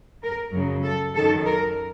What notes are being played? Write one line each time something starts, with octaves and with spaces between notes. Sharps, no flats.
A#4
F#2 C#3 F#3
A4
F#2 D#3 F#3 A4
A#4